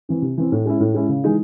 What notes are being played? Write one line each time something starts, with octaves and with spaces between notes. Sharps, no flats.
E3 C4
C3
E3 C4
A2
G#3 C#4 E4
A2
G#3 C#4 E4
C#3
E3 G#3 D#4